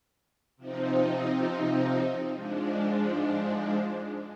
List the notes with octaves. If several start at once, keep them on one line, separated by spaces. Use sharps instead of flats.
C3 F3 C4 D#4
G#2 F3 G#3 D4